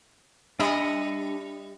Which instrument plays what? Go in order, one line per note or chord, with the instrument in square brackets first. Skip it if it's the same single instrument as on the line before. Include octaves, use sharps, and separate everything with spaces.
[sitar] G3 D#5 E5 [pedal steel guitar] D4 B5